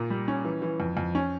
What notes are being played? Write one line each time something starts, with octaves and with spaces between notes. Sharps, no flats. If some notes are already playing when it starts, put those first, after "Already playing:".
Already playing: A#2
G3
C#4
E3
E3
F2
F2
C#4